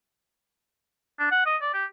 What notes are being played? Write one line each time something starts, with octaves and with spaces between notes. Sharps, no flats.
D4
F#5
D#5
D5
G4